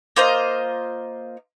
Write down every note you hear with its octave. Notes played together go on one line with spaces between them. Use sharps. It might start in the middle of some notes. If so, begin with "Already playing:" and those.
A#3 F4 C5 D#5